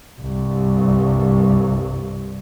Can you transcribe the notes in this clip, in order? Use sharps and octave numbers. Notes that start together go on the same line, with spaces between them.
C2 G2